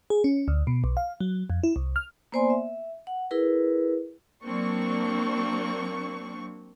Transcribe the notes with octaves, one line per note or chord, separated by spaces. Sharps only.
G#4
C#4
D2
B2
B1
F5
F#3
F2
E4
C2
F6
A#3 B3 C5 D5 G#5 C6
E5
F#5
E4 G#4 A#4 B4
F#3 A#3 C4 D4 C#6